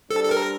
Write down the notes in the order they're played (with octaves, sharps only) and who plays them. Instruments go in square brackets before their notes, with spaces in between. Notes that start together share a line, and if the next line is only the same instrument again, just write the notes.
[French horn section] G3 D4 G4 C5 [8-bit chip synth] A4
[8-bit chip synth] A4
A#4